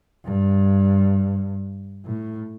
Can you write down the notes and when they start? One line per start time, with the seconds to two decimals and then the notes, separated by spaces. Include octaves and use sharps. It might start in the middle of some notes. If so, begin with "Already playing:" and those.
0.24 G2
2.06 A2